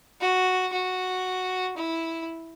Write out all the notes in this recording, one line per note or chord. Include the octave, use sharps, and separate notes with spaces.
F#4
F#4
E4